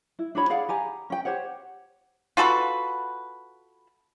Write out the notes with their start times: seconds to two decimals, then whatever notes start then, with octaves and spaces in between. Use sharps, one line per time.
0.19 E4
0.35 D4 F#4 C#5 B5
0.50 G#4 D5 F5 F#5
0.69 G4 G#5 A#5
1.10 C#4 G5
1.25 G4 C5 C#5 F#5
2.37 F4 F#4 A4 B4